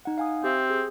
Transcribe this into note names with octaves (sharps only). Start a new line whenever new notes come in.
D#4 F#5
F5 G#5 D#6
C4 G4 E5
G#4